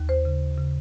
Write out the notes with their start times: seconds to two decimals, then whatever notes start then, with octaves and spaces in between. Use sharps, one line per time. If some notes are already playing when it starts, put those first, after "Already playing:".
Already playing: D#2
0.09 C5
0.25 C#3
0.58 C#3